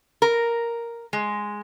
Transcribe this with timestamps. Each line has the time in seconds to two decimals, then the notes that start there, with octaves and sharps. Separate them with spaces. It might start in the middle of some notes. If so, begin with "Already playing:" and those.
0.22 A#4
1.13 G#3